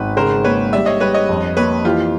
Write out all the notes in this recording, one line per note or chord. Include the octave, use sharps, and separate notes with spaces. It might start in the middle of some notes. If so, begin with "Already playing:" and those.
Already playing: G#1 B4
C#3 A#4 C5
A#3 B4 C#5
G3 D5 E5
C#5 D#5
G3 B4 C#5
C#5 D#5
F2
A#3 B4 C#5
E3 F4 G4